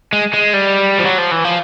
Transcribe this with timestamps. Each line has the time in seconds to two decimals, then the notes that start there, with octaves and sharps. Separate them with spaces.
0.13 G#3
0.34 G#3
0.54 G3
0.99 F3
1.06 F#3
1.18 F3
1.32 E3
1.44 F3